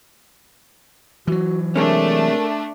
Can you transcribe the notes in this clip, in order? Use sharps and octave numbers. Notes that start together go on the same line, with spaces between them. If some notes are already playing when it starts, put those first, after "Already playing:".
E3 F#3 F#4
C3 G#3 A3 C#4 D4 A#4